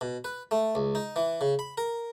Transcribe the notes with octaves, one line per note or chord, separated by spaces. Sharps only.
B2
B4
A3
C#2
D#4
E3
C#3
B5
A#4